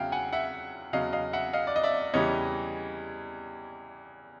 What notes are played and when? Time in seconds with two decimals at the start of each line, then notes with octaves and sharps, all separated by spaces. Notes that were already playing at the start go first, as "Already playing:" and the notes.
Already playing: E2 C#3 F#3 E5 F5 G5
0.12 F#5 G#5
0.33 E5 F#5
0.93 E2 C#3 F#3 D#5 F5
1.13 D#5 F5
1.33 E5 F#5
1.53 D#5 F5
1.67 D5
1.76 D#5
1.84 D5 E5
2.14 E2 C#3 E3 G3 C#5 D#5